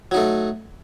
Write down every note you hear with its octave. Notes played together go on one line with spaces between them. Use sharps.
F#3 A3 D#4